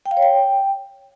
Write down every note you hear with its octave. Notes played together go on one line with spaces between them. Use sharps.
G5
F5
C#5
G5